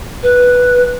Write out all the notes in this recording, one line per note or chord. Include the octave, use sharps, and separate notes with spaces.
B4